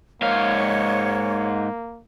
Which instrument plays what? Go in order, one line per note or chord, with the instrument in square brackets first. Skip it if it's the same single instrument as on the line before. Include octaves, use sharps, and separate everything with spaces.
[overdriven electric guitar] G#2 F5 [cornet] A#3 [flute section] C#5